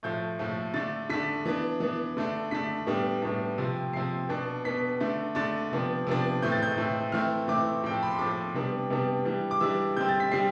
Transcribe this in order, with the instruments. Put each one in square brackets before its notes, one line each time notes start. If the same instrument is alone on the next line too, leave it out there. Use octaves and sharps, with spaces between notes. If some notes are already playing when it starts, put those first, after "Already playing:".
[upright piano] A2 F3 A3 G6
A2 F3 A3
D3 A3 D4 A6
D3 A3 D4 B6
E3 B3 D4
E3 B3 D4
D3 A3 D4
D3 A3 D4 B6
A2 G3 B3 D4
A2 G3 B3 D4
C3 F3 C4
C3 F3 C4 C7
B2 B3 D4
B2 B3 D4 B6
D3 A3 D4
D3 A3 D4 A6
C3 F3 B3 D4
C3 F3 B3 D4
A2 E3 A3 C4 G6
A6
G6
A2 E3 A3 C4
E3 A3 C4 F6
E3 A3 C4 D6
A2 F3 C4 G5
A5
B5
C6
A2 F3 C4 D6
C3 G3 B3 D4
C3 G3 B3 D4
E3 G3 D4
D6
E3 G3 D4 E6
D3 G3 C4 G6
A6
B6
D3 G3 C4 C7